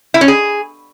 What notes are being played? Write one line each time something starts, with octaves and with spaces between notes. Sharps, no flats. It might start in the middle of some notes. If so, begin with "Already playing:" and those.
E4
C#4
G#4